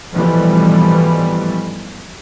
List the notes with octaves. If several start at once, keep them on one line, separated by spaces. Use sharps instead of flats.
G#1 B2 E3 F3 G3 A3